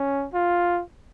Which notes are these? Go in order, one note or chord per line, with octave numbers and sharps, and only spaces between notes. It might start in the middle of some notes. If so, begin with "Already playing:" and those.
Already playing: C#4
F4